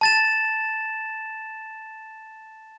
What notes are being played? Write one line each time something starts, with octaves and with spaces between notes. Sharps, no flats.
A5 A6 E7